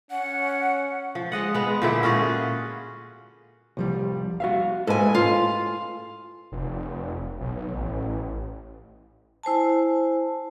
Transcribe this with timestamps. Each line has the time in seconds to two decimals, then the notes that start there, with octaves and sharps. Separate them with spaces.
0.11 C#4 F#5
1.15 F3
1.32 G#3 D#5 F#5
1.54 G#3 B3
1.82 A#2 D3 E4
2.03 C#4 F4 F#4 G#4
3.77 C2 F3 G3
4.40 F#4 E5 F5
4.87 G#2 A4 B4 G#5
5.15 F4
6.52 F1
7.40 B1
7.72 A1
9.43 E4 C5 G#5 A5